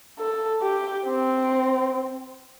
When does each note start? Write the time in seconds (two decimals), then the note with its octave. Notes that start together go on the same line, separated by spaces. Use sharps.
0.19 A4
0.62 G4
1.06 C4